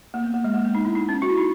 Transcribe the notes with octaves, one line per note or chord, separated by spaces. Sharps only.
A#3
B3
A#3
G#3
A#3
B3
D#4
E4
D#4
C#4
F#4
E4
D#4